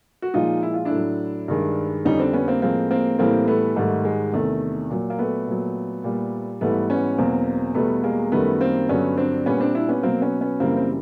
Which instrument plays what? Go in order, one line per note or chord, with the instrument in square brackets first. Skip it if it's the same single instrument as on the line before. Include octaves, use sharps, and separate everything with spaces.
[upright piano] F#4
A#2 F3 G#3 D#4 F4
E4
F4
D4 E4
A2 F#3
G2 D#3 G#3
F2 D3 G3 C#4 D#4
C4 D4
B3 C#4
A#3 C4
A2 F3 G#3 A#3 C4
A#3 C4
A2 E3 G3 A#3 C4
A3 B3
G#2 D#3 G3 A3
G#3
E2 C3 D#3 A3
A#2 F#3
A#3
A3 B3
A#2 F#3
A#2 G3
G#2 E3 G3 A3 B3
B3 C#4
E2 B2 F#3 A#3 C4
E2 B2 G3 A3 B3
G#3 A#3
F#2 D#3 G3 A3 B3
A#3 C4
G2 D3 F#3 B3 C#4
C4 D4
A#2 G3 B3 C#4
C4 D4
D4 E4
B3 C#4
B2 F#3 A#3 C4
B3 C#4
B3 C#4
F#2 C#3 E3 G3 A#3 C4
C4